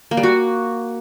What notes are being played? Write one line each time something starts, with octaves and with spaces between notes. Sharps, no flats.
A#3
G3
F#4